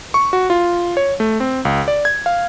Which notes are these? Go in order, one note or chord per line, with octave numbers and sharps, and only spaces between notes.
C#6
F#4
F4
C#5
A3
C4
C#2
D5
G#6
F5